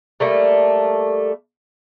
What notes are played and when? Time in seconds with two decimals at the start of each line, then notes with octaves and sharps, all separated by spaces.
0.20 G3 A3 A#3